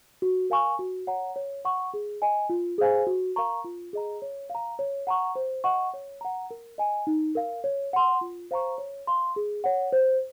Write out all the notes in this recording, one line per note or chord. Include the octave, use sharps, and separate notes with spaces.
F#4
A#4 F5 G#5 C#6
F#4
C#5 F#5 A#5
C#5
F#5 C#6
G#4
D#5 G#5
F4
G#4 C5 F5 G#5
F#4
A#4 F5 A#5 C#6
F4
G#4 D#5 A#5
C#5
F5
A#5
C#5
F#5 A#5 C#6
C5
D#5 F#5 C#6
C#5
F#5 A#5
A#4
D#5 G#5
D#4
A#4 F5
C#5
F#5 C6
F4
C5 F5 A#5 C#6
C#5
F5 C6
G#4
C#5 F#5
C5